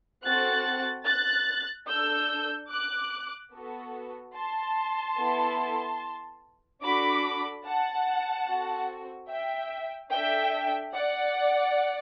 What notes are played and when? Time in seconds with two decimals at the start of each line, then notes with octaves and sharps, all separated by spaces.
0.23 C4 F#4 A4 F#6 A6
1.06 F#6 A6
1.88 D4 A4 E6 G6
2.71 D6 F#6
3.53 B3 F#4 A4
4.35 A5 C6
5.18 B3 E4 A4
6.82 D4 F#4 A4 B5 D6
7.65 F#5 A5
8.47 C4 F#4 A4
9.29 E5 G5
10.11 D4 A4 E5 G5
10.94 D5 F#5